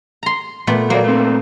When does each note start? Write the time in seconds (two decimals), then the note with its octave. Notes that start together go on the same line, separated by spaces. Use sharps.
0.23 A#5 C6
0.67 A#2 A3 B3
0.90 F#3 A#3 C5 D5
1.04 A3 C4